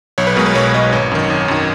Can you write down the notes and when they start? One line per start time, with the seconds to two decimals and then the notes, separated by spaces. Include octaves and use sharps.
0.18 B1 C#5
0.27 B4
0.36 B2 G#3 A#4
0.46 B4
0.55 B1 C#5
0.74 B2 G#3 D#5
0.93 G#1 C#5
1.11 F#2 D#3
1.30 G#1
1.48 F#2 D#3